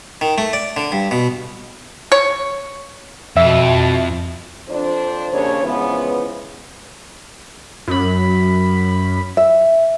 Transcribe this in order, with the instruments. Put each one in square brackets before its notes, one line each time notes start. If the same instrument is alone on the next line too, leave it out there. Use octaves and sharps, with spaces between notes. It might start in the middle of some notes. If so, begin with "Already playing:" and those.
[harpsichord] D#3
A3
D5
D3
G2
B2
[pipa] C#5
[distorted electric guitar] F2 [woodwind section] B2 [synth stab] E5
[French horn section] F2 D4 C5
D#2 C#3 C#4 D4 C#5
C#3 E3 F3 G#3 B3
[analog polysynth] F#2 B5
[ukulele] E5